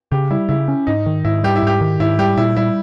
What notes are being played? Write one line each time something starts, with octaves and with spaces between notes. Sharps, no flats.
C#3 G4
G3 E4
C#3 E4
C#4
G#2 D#4
D#3
G#2 E4
G3 G4
E4
G#2 G4
D#3
G#2 E4
G3 G4
A#2 E4
G3 E4